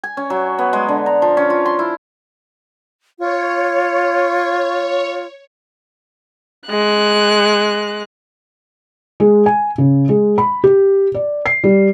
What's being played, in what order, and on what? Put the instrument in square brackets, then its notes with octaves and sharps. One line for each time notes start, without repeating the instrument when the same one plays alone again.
[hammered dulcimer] G#5
C#4
F#3
B3
G#3
D3
A#5
F3
C#4
F4
C6
E4
[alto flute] F4 [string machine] C#5
[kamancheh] G#3 F#6
[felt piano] G#3
G#5
C#3
G#3
B5
G4
D5
C7
G3